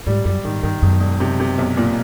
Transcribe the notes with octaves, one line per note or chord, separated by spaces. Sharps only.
G#2 G3
F#2 G3
G#2 D#3
G2 D#3
E1 F#2
E1
C3
C3
B1
A#2